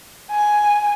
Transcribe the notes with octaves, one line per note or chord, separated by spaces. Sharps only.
G#5